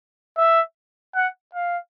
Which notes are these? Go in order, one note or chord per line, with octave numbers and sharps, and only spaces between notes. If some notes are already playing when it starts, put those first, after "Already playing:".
E5
F#5
F5